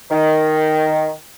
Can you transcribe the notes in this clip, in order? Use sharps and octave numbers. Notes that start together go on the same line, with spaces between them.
D#3